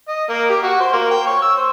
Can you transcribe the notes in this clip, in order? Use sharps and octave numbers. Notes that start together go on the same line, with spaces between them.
D#5
A#3
G4
F#4
C5
A#3
G5
C#5
E6
C5